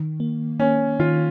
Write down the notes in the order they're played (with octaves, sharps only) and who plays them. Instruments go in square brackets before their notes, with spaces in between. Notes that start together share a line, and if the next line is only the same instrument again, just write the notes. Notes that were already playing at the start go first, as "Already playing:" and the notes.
Already playing: [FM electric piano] D#3
A#3
[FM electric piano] A#3 [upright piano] C#4
[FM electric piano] D#3 [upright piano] F4